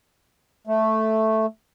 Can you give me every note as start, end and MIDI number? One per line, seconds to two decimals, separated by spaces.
0.67 1.46 57